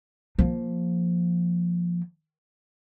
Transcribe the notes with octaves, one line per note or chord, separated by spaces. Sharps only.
F3 A#3